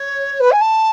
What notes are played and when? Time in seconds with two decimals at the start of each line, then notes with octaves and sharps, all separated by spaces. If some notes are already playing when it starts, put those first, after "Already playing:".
Already playing: C#5
0.40 B4
0.51 G#5
0.61 A5